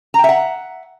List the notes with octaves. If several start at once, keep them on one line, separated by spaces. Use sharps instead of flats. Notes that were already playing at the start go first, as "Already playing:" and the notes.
E5 F#5 G5 A#5